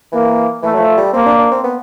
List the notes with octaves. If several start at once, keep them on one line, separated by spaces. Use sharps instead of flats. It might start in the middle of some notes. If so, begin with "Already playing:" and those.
E3 A#3
E3 A3
F#3
F3
G3
A#3 C4
D4
D4
C4
B3